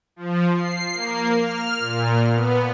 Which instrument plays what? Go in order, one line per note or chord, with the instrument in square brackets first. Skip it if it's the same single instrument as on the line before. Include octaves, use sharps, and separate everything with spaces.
[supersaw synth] F3
C7
A#3
F6
A#2
B3